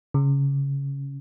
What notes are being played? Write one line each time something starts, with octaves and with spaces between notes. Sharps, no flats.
C#3